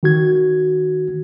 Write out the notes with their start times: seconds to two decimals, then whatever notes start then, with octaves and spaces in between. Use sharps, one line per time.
0.03 D#3 F#4 G#6